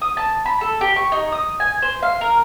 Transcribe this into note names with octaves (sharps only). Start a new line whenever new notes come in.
D#6
A5
B5
A4
G4
C#6
D#4
D#6
G#5
C5
F5
A#4